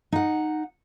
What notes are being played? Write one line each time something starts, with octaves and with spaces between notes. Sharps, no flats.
D#4 F#5